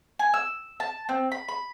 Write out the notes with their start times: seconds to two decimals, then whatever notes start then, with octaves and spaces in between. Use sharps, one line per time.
0.19 G#5
0.34 E6
0.80 A5
1.09 C4
1.32 B5
1.48 B5